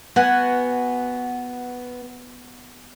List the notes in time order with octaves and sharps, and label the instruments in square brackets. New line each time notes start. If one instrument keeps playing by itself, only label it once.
[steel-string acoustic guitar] B3 [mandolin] F#4 F#5 G#5